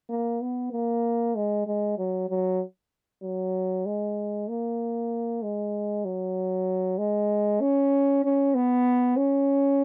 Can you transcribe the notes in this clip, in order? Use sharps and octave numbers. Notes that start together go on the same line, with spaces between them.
A#3
B3
A#3
G#3
G#3
F#3
F#3
F#3
G#3
A#3
G#3
F#3
G#3
C#4
C#4
B3
C#4